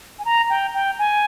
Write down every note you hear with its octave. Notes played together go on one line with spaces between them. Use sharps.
G#5
A#5
G5
G5
G#5